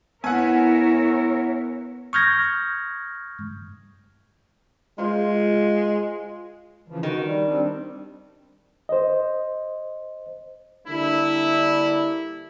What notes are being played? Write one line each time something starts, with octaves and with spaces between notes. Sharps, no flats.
B3 E4 A#4 C#5 E5 F#5 G#5
C#6 D#6 F6 G6 G#6 A#6
G#3 F4 C5 F5
C#3 E3 F3
D#3 F#4
G3
G3 C4 D4
C5 D#5
D3 G3 A#3 D4 E4